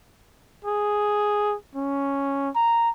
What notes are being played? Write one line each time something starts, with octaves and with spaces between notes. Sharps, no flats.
G#4
C#4
A#5